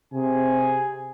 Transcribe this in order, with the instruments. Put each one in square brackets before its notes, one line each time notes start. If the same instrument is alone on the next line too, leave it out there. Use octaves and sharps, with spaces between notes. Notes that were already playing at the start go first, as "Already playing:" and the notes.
[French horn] C3 [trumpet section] G#4 G#5